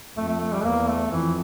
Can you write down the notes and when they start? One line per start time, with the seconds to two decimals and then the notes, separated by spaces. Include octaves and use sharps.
0.17 F2 A3
0.29 A3
0.41 A3
0.53 G3
0.64 E2 A#3
0.88 A3
1.12 F2 E3